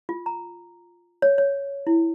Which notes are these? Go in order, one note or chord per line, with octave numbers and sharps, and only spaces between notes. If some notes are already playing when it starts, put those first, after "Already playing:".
F4
A#5
C#5
C#5
E4